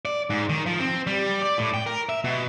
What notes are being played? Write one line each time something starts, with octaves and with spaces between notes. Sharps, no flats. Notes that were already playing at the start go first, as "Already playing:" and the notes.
D5
G#2
D#3
F3
C4
G3
D5
A2
G5
A#4
E5
B2